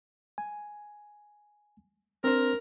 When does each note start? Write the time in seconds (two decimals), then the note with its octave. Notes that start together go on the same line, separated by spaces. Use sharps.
0.38 G#5
2.24 C4 D4 A#4 C5